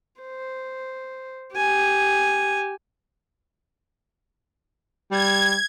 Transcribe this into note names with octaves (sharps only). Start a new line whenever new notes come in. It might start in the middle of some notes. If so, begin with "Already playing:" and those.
C5
G4 G#5
G3 G#6